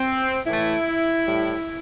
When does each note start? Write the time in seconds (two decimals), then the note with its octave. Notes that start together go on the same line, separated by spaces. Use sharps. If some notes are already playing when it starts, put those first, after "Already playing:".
Already playing: C4
0.47 A2 E3 A3 E4
1.27 A2 G3